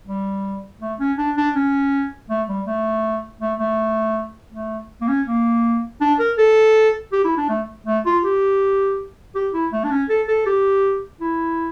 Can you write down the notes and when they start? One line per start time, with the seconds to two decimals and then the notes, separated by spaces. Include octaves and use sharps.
0.06 G3
0.81 A3
1.00 C#4
1.18 D4
1.37 D4
1.55 C#4
2.29 A3
2.48 G3
2.66 A3
3.41 A3
3.59 A3
4.52 A3
5.01 A#3
5.08 C#4
5.27 A#3
6.01 D4
6.19 A#4
6.38 A4
7.12 G4
7.24 E4
7.37 D4
7.49 A3
7.86 A3
8.06 F4
8.24 G4
9.35 G4
9.54 E4
9.72 A3
9.84 D4
9.91 C#4
10.09 A4
10.28 A4
10.46 G4
11.21 E4